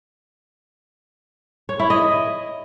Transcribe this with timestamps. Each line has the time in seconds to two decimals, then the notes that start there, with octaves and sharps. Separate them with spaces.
1.69 C#5
1.80 E4
1.90 D#5